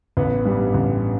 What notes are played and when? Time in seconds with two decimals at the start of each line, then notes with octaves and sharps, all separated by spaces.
0.17 A1 B3
0.45 G2 G3
0.74 A1